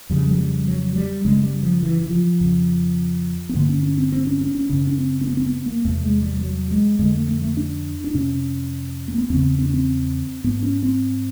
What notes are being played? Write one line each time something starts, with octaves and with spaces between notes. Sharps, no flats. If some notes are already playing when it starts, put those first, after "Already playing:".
F2 C#3 G3
F#3
G3
F#3
G3
F#2 C#3 G#3
G3
F3
E3
E3
F3
F2 C#3
B3
G2 D3 A#3
C#4
C#4
C4
C4
C#4
C#4
C#4
F#2 C#3 C#4
C#4
C4
C4
B3
C4
B3
A#3
E2 C3 A3
G#3
G3
G3
F#3
G#3
F2 D3 G#3
A3
A3
A3
D4
D4
F2 C3 C#4
A#3
B3
E2 C#3 C4
C4
C#4
C4
G#2 B3
C#4
C4